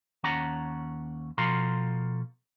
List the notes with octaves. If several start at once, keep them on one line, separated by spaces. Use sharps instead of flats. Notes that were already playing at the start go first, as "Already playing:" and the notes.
D#2 C#4 F#5 A5 A#5
B2 F3 A4 F5 A#5 C6